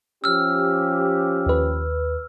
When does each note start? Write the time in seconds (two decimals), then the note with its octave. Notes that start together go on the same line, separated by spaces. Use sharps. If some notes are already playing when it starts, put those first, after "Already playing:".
0.24 F3 C#4 G4 E6 F6
1.46 D#2 B4